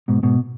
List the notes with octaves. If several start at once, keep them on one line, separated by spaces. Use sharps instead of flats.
G#2 B2
G#2 B2